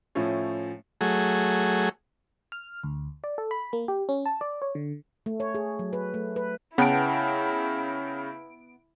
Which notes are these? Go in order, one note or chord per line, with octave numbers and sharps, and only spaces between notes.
A2 F3 A3 C#4
F#3 A3 G#4
F6
D2
D5
A4
B5
A#3
G4
C#4
A5
D5
C#5
D3
A3
C#5
G#4
F#3
B4
A3
B4
C#3 B3 E4 F#5 G5 A5 D7